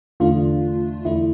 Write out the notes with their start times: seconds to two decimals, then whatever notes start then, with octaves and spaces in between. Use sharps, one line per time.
0.20 E2 D3 A3 D4 F4
1.05 E2 D3 A3 D4 E4